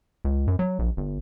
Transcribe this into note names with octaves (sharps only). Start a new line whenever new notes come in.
C#2
F#2
F#3
A#1
G1